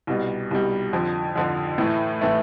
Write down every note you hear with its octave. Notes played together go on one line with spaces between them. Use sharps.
C2 B2 G3
C2 B2 G3
F2 D3 F3
F2 D3 F3
A2 E3 A3 E4
A2 E3 A3 E4